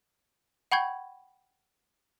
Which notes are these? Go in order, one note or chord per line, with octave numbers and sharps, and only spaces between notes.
F#5 G5 B5 C#6 G6 G#6